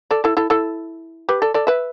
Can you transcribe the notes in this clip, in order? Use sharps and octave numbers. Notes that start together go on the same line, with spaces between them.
A4 D5
E4 A4
E4 A4
E4 A4
G4 B4
A4 D5
A4 D5
B4 E5